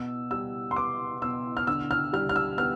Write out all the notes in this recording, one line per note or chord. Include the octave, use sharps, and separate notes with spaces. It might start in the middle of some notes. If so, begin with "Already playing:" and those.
Already playing: B2 E6
G3 E6
C6
B3 D6
B2 E6
F6
D3 E6
F6
G3 F6
F6
E6
B3 F6